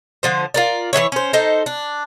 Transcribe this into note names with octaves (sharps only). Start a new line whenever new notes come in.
D3 F3 C5
F4 A#4 D5
E3 G#3 E4 C#5
C#4 C5
D#4 A4 C5
D4